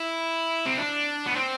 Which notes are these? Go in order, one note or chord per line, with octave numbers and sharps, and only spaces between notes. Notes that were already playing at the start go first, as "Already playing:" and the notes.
Already playing: E4
C4
D4
B3
C4